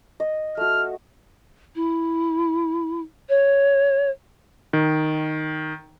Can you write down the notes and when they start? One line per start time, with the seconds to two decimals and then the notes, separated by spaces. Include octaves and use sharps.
0.20 D#5
0.57 A3 F#4 F6
1.75 E4
3.29 C#5
4.73 D#3